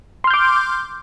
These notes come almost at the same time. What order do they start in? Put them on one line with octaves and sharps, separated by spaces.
C6 F6 G6 D6